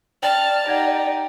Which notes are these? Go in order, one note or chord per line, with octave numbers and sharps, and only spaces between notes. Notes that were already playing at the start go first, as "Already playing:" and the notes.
D5 G5 A5 F6
D#4 G4 F#5 G#6 A#6